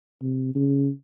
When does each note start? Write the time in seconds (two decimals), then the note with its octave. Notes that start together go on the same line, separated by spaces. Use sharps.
0.22 C3
0.55 C#3